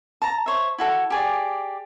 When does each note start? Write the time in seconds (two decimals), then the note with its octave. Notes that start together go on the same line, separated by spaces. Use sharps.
0.22 A5 A#5
0.46 C5 C#5 E5
0.78 E4 F#4 A4
1.10 G4 G#4 D5